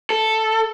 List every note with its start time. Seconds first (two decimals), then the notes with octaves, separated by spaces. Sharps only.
0.10 A4